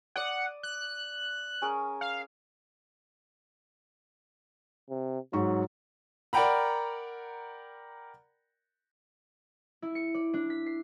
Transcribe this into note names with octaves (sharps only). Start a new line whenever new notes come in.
D5 F#5 D#6
F#6
C#4 G#4 A#4
F5
C3
G#2 F#3 C#6
A#4 D5 F#5 G5 A#5 B5
E4
C#7
D5
D4
B6
C7